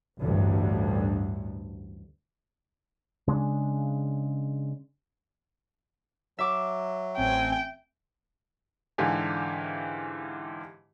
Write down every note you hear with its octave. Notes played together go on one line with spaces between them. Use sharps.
A1 D2 G2
C#3 G#3 B3 D4
F#3 E5 D6
A1 C4 G5 G#5
G#2 D3 E3 G4 F5 G#5